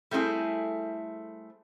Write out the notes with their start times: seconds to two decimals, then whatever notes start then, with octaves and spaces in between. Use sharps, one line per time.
0.11 G3 A3 C4 E4 G#4